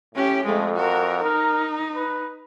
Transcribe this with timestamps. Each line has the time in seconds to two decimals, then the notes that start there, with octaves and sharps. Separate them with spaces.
0.15 A2 C#4 G4
0.45 F2 G#3 A3
0.75 F#4 A#4
1.23 D#4 A#4
1.96 B4